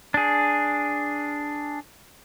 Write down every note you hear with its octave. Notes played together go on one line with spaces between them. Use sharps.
D4 G#4